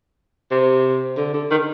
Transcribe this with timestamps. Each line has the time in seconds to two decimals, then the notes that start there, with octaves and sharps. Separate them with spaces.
0.51 C3
1.17 D3
1.34 D3
1.51 D#3